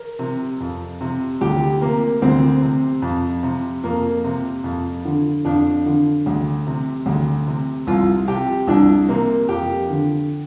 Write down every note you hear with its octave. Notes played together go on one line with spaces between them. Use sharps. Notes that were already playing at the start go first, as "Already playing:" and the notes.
Already playing: A#4
C3
F2
C3
D2 G4
C3 A#3
D2 C4
C3
F2
C3
F2 A#3
C3
F2
D3
F2 D4
D3
D2
C3
D2
C3
C2 F4
C3 G4
C2 D4
C3 A#3
F2 G4
D3